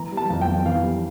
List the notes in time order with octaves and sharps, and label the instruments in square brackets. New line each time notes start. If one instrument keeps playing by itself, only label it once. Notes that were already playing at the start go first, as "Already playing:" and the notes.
Already playing: [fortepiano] E3 A#5
G3
A5
F2
G5
F2
E3 F5
G3